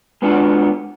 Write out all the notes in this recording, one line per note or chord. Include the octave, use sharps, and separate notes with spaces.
G#3 B3 D4 F4 F#4